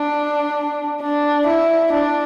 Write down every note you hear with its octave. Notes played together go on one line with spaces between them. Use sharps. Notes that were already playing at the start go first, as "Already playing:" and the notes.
Already playing: D4
D4
E4
D4